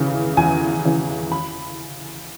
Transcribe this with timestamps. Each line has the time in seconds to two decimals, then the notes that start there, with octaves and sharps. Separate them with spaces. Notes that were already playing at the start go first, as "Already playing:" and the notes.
Already playing: E2 C#3 E3
0.37 E2 G#5
0.85 C#3 E3
1.32 B5